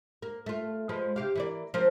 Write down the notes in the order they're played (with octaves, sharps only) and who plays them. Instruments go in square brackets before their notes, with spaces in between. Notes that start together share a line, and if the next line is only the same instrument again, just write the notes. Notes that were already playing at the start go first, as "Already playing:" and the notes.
[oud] A#3
A3 F4
F3 G#3 B4
C3 G4 F5
E3 A#3 D5
F3 C4 A#4